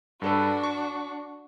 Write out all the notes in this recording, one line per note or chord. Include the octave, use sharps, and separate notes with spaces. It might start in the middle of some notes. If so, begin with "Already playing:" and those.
G2 D4 F#4 A4 B4
C#6